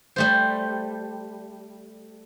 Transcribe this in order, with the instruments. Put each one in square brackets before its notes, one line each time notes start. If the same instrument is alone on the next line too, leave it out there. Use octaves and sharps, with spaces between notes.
[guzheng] G3 A3 C5